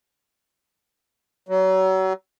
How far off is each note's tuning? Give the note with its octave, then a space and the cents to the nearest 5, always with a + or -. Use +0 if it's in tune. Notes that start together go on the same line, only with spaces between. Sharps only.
F#3 +35